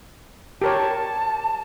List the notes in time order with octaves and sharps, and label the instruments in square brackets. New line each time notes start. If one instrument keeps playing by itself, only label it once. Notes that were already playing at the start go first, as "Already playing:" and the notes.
[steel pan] G4 A#4 C#5 [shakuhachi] A5